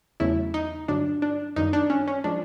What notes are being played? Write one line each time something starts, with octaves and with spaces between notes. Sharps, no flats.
E2 C#3 F#3 A3 E4
D#4
G2 D3 F#3 D4
D4
F#2 D#3 G3 A#3 D#4
D4
C#4
C#4
F3 G#3 D4